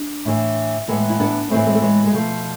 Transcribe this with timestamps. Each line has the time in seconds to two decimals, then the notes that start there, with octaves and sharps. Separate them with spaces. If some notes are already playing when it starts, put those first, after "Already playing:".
Already playing: D4
0.25 A2 E3
0.88 A2 E3 G#3 B3
1.10 E4
1.20 B3 D4
1.50 A2 E3 A3 C4
1.67 G#3
1.74 A3
1.82 G#3 B3
2.06 G#3
2.13 B2 F3 A3